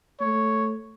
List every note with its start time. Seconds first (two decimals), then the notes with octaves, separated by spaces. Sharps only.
0.21 A3 C#5